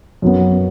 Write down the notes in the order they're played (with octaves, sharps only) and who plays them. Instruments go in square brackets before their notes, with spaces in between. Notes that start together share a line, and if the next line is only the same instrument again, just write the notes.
[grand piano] F#2 F#3 B3